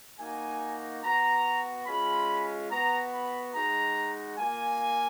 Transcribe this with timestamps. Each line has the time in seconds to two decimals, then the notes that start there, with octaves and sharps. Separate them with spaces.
0.18 A#3 D#4 F#4 G#5
1.02 B3 F#4 A#5
1.86 G#3 C#4 F4 B5
2.70 B3 F#4 A#5
3.12 B5
3.53 G#3 D#4 F#4 A#5
4.37 A#3 F4 G#5